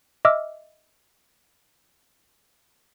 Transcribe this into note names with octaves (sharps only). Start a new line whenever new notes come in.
D#5 E5 D6 E6 F6